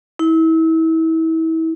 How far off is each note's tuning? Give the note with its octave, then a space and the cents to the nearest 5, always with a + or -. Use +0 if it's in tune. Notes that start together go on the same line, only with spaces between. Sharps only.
E4 -35